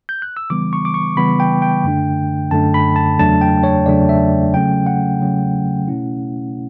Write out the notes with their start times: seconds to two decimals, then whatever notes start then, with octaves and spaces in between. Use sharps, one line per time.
0.09 G6
0.22 F#6
0.37 E6
0.50 C#3 E3 G3 B3 D6
0.73 C#6
0.85 D6
0.94 C#6
1.17 C#3 E3 G3 B3 B5
1.40 G5
1.62 G5
1.84 F#2 D3 A3 D4
2.51 F#2 D3 A3 D4 A5
2.74 B5
2.96 A5
3.19 E2 C#3 F#3 A3 D4 A5
3.41 G5
3.63 C#5
3.86 E2 C#3 F#3 A3 D4 D5
4.09 E5
4.53 C#3 F#3 A3 C#4 G5
4.86 F#5
5.20 C#3 F#3 A3 C#4
5.88 B2 A3 C#4 E4